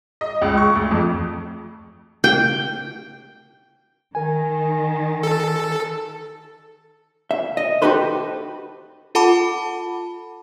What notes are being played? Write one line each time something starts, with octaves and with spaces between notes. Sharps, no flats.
D#5
C#2
C#6
D2
F2
G5
D#3 A#4 G#5
A4
E5
D#5
D#4 F#4 G4 A4 B4 C5
F4 A4 F#5 A5 B5 D6